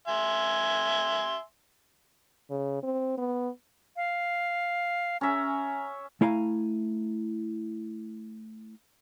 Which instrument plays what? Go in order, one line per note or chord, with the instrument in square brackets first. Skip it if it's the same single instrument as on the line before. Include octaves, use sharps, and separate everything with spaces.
[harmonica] E5 G#5 C6
[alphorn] C#3
C4
B3
[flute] F5
[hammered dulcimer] C#4 E5 [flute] A#5
[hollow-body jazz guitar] A3 E4 F5 G#5 A#5